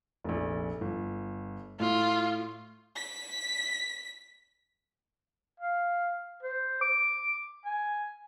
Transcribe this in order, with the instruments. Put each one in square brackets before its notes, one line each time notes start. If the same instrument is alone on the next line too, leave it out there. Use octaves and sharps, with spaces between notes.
[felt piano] F1 A#1
G1
[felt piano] A2 [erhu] F4
[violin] B6
[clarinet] F5
C5
D6
G#5